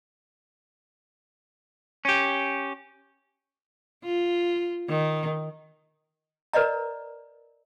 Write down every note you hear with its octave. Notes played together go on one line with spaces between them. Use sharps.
C#4 G4
F4
D#3
A#4 B4 D5 D#5 A#5